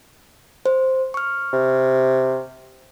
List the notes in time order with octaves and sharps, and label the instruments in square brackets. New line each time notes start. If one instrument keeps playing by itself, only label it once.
[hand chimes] C5
C#6 F6
[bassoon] C3